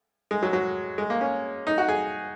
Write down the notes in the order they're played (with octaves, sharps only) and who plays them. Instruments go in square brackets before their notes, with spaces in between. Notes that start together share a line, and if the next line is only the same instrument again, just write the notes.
[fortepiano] G#3
F#3
F#3
G#3
A#3
C#4
D#4
F#4
G#4